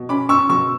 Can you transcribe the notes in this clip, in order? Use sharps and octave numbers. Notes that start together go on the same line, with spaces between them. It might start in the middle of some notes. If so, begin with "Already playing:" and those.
Already playing: B2
C#4 B5 D6
C#4 C#6 E6
B2 C#6 E6